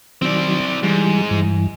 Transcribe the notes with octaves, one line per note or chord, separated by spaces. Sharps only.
D#3 F#3 C4 D5
G#2 E3 G3
G2 E3